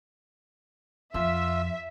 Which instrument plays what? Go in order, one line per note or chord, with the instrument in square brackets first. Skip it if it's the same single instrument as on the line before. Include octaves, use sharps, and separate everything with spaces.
[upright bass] F2 [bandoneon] F4 E6 [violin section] E5